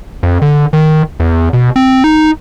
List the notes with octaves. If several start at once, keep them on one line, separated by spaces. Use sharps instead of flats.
F2
D3
D#3
E2
B2
C4
D#4